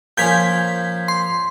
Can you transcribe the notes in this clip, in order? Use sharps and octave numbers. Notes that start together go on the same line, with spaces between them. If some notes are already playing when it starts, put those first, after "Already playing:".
A#2 F3 C#4 G6 G#6 B6
C6